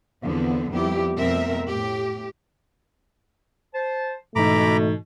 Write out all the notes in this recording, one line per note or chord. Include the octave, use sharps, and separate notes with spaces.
E2 D3 F3 B3 C4
F2 G3 B3 E4 G4
F2 B2 A3 C4 A#4 E5
A2 G4
C5 A5
G#2 B2 E3 A3 D#4 A#5 B5 D6